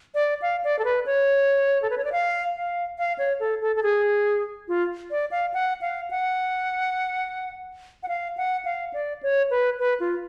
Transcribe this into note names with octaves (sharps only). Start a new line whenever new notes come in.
D5
F5
D5
A4
B4
C#5
A4
B4
C#5
D5
F5
F5
F5
C#5
A4
A4
A4
G#4
F4
D5
F5
F#5
F5
F#5
F#5
F5
F#5
F5
D5
C#5
B4
B4
F4